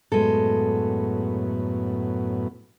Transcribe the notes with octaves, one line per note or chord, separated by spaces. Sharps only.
F#2 A2 G#3 B3 A4